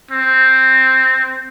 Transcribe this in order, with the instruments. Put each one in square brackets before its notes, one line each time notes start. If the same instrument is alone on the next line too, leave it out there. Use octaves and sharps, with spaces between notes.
[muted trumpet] C4